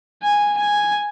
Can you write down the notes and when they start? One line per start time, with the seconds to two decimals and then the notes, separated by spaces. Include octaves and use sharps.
0.23 G#5
0.57 G#5